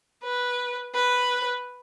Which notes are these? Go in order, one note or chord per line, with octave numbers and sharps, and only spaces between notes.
B4
B4